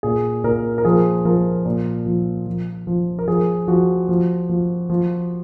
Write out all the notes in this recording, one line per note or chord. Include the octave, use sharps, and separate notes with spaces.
A#2 G#4
A#2 A#4
A#4
F3 G#4
F3 A#4
A#2
F3
F3
F3
A#4
F3 G#4
F3 F#4
F3
F3
F3